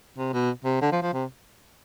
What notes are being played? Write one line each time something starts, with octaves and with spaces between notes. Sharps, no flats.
C3
B2
C3
D3
F3
F3
C3